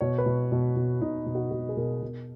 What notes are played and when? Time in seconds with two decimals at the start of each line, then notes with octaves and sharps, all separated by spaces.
0.01 B2 C#5
0.18 B4
0.26 B2
0.52 B2
0.76 B2
1.02 B2 D#4
1.26 B2
1.35 F#4
1.51 B2 F#4
1.69 G#4
1.77 B2 A#4
2.02 B2